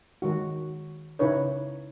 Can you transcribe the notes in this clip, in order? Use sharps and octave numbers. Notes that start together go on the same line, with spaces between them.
D#3 G#3 F#4
C#3 D#4 E4 B4 C#5